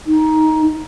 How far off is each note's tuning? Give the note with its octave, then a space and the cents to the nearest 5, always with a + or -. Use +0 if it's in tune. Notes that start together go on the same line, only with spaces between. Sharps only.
D#4 +10